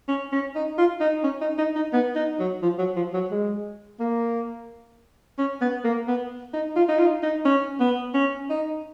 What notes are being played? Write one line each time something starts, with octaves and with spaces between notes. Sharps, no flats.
C#4
C#4
D#4
F4
D#4
C#4
D#4
D#4
D#4
B3
D#4
F#3
F3
F#3
F3
F#3
G#3
A#3
C#4
B3
A#3
B3
D#4
F4
D#4
F4
D#4
C#4
B3
C#4
D#4